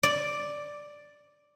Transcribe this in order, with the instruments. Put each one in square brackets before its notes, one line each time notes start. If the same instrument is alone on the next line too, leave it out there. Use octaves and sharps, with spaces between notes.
[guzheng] D5